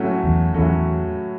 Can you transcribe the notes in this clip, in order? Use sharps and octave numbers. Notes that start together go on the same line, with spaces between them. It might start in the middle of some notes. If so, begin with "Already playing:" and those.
Already playing: A2 F#3 A3 C#4 F#4
E2
E2 A2 F#3 A3 C#4 F#4